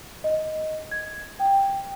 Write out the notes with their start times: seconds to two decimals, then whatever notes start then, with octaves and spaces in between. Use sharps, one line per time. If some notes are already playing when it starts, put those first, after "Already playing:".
0.24 D#5
0.91 G#6
1.40 G5